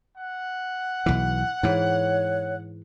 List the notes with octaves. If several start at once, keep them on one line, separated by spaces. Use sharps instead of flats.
F#5
B1 E3
G#2 E3 C#5